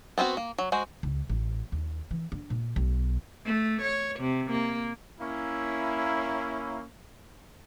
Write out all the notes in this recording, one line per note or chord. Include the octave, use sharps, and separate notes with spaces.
B3 C4 F4 F#4
A#3
F#3
G#3 F#4 C5
C#2
A1
D#2
E3
D4
A#2
B1
A3
C#5
C3
A#3
A#3 C#4 E4